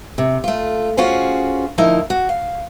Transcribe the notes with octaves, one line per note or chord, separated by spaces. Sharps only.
C3
A3 F4
C#4 F4 F#4 G#4 C5
D2 F3 D#4 E4 A#4
F#4
F5